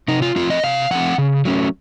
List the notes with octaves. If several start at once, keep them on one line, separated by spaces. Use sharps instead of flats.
C3 D#4
F4
F3 A3 C4 F4
D#5
C3 F5
F3 A3 C4 F#5
C#3
F#3 A3 C#4